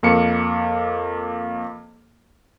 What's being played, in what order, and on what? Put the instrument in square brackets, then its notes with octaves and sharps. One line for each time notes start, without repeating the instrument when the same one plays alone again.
[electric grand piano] F2 A#3 C#7